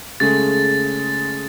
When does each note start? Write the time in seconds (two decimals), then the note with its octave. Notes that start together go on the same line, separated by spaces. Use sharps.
0.20 C#3 G#3 A3 A6